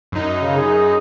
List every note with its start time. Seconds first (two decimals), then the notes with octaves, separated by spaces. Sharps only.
0.12 F#2 D#4
0.41 C#3
0.57 G#4